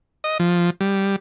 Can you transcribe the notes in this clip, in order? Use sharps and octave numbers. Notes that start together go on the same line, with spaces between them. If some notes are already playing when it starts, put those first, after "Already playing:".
D#5
F3
G3